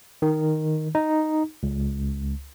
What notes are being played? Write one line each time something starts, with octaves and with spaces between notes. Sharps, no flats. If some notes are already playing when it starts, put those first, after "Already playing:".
D#3
D#4
C#2